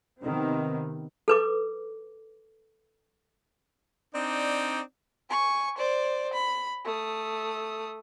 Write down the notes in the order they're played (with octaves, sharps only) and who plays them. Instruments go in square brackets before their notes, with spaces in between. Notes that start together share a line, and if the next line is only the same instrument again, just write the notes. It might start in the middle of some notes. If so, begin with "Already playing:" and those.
[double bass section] C3 D#3 B3 C4
[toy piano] A4 B4 D6
[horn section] C4 D4 D#4 D5
[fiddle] G#5 C#6
C5 D5
B5
A3 D#6